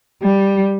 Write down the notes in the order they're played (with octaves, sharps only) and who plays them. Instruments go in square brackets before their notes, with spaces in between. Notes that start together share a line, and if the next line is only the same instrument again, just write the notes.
[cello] G3